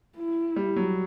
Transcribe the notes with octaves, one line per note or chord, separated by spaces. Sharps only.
E4
G3
F#3